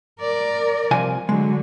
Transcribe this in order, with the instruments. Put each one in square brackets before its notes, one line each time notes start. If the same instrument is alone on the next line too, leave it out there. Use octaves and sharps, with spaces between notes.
[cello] A#4 D5
[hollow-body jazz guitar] C2 F3 G#5
[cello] D3 F#3 [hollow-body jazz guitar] G#3